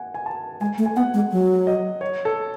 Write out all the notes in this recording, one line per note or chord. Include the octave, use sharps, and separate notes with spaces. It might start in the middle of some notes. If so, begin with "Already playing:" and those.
Already playing: F#5 G#5
G#5
A5
G#3 G#5
A3
G#5
B3 F#5
G#3
F#3
D#5
C#5
A4